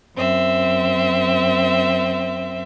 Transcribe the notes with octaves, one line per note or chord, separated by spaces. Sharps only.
F#2 C4 E5